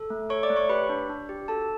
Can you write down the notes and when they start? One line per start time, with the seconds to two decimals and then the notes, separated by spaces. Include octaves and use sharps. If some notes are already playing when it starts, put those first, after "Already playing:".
Already playing: A4
0.10 A3
0.30 A4 C#5 C#6
0.43 D5 D6
0.50 A3
0.56 C#5 C#6
0.69 G4 B4 B5
0.89 D4
1.09 D4
1.29 G4
1.48 F#4 A4 A5